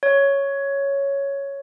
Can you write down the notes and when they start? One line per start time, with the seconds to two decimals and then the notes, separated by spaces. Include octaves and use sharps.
0.03 C#5